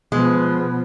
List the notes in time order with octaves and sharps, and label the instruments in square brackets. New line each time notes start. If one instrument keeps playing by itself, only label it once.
[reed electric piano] B2 [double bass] F3 [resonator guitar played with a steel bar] G#3 [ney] B3